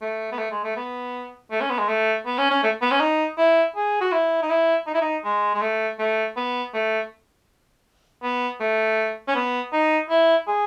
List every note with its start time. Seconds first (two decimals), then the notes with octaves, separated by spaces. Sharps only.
0.01 A3
0.32 B3
0.39 A3
0.51 G#3
0.64 A3
0.77 B3
1.51 A3
1.61 C#4
1.70 B3
1.79 G#3
1.88 A3
2.26 B3
2.38 C#4
2.50 C#4
2.63 A3
2.81 B3
2.91 C#4
3.00 D#4
3.38 E4
3.75 G#4
4.01 F#4
4.12 E4
4.43 D#4
4.50 E4
4.87 D#4
4.94 E4
5.01 D#4
5.24 G#3
5.55 G#3
5.62 A3
5.99 A3
6.36 B3
6.74 A3
8.23 B3
8.60 A3
9.28 C#4
9.35 B3
9.72 D#4
10.10 E4
10.47 G#4